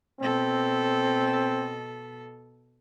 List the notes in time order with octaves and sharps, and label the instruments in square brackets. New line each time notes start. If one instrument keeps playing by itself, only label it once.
[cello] B2 A4 [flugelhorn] C4